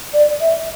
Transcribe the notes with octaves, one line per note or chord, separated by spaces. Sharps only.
D5
E5